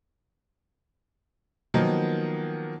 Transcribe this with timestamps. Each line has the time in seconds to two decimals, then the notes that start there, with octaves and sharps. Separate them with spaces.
1.74 D#3 F3 F#3 A#3 B3 D#4